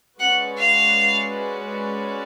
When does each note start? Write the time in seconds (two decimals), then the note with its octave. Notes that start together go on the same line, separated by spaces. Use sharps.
0.19 G#3 C#4 F#4 B4 D5 F#5
0.58 F5